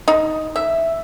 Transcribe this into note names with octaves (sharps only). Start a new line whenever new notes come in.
D#4
E5